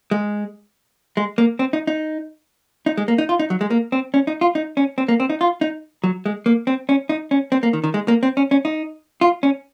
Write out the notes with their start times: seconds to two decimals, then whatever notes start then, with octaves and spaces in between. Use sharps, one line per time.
0.11 G#3
1.17 G#3
1.38 A#3
1.59 C4
1.73 D#4
1.87 D#4
2.86 D#4
2.98 G#3
3.08 A#3
3.18 D#4
3.29 F4
3.39 D#4
3.50 F#3
3.61 G#3
3.71 A#3
3.92 C4
4.14 C#4
4.27 D#4
4.41 F4
4.55 D#4
4.77 C#4
4.98 C4
5.08 A#3
5.20 C4
5.30 D#4
5.41 F4
5.61 D#4
6.04 F#3
6.26 G#3
6.46 A#3
6.67 C4
6.89 C#4
7.09 D#4
7.31 C#4
7.52 C4
7.63 A#3
7.73 D#3
7.84 D#3
7.94 G#3
8.08 A#3
8.23 C4
8.37 C#4
8.51 C#4
8.65 D#4
9.21 F4
9.43 C#4